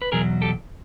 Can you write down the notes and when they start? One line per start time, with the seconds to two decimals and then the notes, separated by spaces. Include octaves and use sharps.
0.02 B4
0.12 E2 B2 F#3 G#4 A#4
0.42 G4 A4